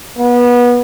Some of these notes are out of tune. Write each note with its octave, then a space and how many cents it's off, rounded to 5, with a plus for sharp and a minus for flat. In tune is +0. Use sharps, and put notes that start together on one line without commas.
B3 -25